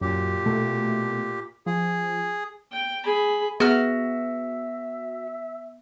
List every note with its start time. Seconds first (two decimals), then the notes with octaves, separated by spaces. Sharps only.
0.01 F#2 A#2 G4
0.46 B2 A3
1.66 F3 G#4
2.72 G5
3.04 G#4 B5
3.60 B3 F#4 G#4 E5 F6